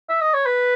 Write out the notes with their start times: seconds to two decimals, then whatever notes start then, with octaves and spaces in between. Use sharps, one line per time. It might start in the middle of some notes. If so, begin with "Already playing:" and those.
0.09 E5
0.21 D#5
0.33 C#5
0.46 B4